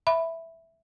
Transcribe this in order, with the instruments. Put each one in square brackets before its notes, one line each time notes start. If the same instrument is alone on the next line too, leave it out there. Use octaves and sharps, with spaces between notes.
[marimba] E5 B5